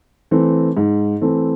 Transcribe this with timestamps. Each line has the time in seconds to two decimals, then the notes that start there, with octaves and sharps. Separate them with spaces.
0.31 E3 A3 C4
0.77 G#2
1.21 E3 A3 C4